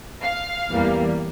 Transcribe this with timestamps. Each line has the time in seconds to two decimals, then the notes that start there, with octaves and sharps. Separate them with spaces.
0.22 F5
0.69 E2 E3 G3 A#3